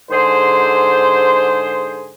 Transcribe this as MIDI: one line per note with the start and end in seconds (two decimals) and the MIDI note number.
0.11 2.13 44
0.11 2.13 50
0.11 2.13 68
0.11 2.13 72